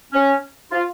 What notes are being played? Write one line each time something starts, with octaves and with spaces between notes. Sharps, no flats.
C#4
F4